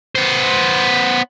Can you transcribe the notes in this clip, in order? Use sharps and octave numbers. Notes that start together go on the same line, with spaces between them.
B3 C5